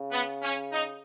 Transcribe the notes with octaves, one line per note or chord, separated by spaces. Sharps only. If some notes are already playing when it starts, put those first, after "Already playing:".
Already playing: C#3
B3
C#4
D#4